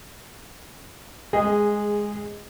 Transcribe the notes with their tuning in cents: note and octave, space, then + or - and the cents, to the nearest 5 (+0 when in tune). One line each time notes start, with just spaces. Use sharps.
G#3 +0 G#4 -15 D#5 +0